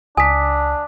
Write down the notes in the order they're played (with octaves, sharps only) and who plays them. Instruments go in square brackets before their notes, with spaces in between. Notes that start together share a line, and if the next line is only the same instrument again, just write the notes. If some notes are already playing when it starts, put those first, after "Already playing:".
[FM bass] C#2 [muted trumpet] D4 [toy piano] G#5 [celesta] D#6 B6